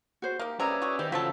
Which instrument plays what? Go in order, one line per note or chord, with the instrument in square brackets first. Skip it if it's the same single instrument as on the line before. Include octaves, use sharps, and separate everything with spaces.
[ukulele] F#4 C5
[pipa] A#3 G4 [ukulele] D#4
[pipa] C3 A#3 G#4 [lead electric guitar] C#4 [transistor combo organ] B4 D5 E5 [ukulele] A#5
[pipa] F#4 G#4
[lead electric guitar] D#3 [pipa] G4 [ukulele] C5
[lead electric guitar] C#3 E3 [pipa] F#3 A3 A4 [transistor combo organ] F4 C5 [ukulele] E5